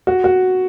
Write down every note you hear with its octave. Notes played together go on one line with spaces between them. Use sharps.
F#4
F#4